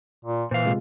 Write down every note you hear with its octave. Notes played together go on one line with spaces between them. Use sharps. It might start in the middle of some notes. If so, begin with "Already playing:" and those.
A#2
A#2 E3 C5 F5
C3 G#3 F4